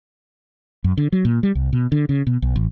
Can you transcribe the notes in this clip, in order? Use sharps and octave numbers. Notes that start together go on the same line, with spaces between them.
F#2
D3
F#3
A#2
G3
C2
B2
D3
C#3
B2
B1
A1